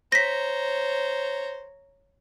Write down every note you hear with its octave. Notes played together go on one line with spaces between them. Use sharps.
C5 C#5 A#5 A#6 B6